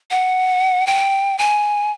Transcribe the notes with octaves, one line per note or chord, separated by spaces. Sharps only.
F#5
G5
G#5